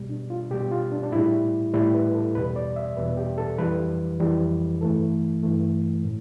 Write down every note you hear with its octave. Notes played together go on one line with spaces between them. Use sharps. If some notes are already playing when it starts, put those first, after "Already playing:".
Already playing: B2 G3
D4
F4
B2 G3 G4
F4
D4
D4
A2 G3 E4
A2 G3 E4
B4
A4
E2 B2 G3 B4
D5
E5
E2 B2 G3 B4
G4
A4
F2 E3 G3 B4
F2 E3 G3
G2 E3 A3 A4
G2 E3 A3
A2